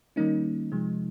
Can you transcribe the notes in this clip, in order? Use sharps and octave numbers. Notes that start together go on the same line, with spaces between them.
D#3 G3 A#3 C#4 D#4
C3 F3 G#3